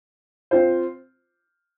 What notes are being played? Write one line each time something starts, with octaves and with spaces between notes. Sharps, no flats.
C4 F4 C5